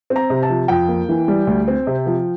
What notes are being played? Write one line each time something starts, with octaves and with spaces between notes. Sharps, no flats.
C4
A#5
C3
A5
F3
F2 G5
A#3
E3
G3
D2
C4
C3
F3